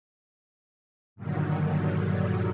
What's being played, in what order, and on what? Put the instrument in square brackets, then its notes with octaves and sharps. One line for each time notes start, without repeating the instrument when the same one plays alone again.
[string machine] G2 A#2 D3 D#3 F#3